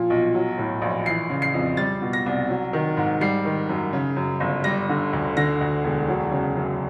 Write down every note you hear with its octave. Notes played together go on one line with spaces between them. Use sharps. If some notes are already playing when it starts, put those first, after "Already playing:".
Already playing: A#2 F3
B1
F#3
A2
A#1
E3 C7
C#3
C7
F2
G3 A6
B2
A#6
C2
F#3
D#3
G#2
G3 C7
D#3
F#2
C#3
F#2
G1
G3 A#6
D3
D2
D3 A#6
D2
E1
F#3
C#3
F#2